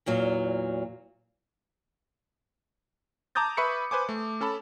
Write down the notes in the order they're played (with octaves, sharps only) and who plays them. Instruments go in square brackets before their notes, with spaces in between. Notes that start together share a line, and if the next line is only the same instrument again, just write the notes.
[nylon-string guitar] E2 A#2 F#3
[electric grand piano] A5 A#5 D6 D#6 G6 A6
B4 E5 B5 C#6 C#7
B4 C5 G#5 D6
A3
C#4 A4 A5 B5